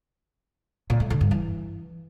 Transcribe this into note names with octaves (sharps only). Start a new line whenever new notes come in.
A#2
A3
D3
G2
E3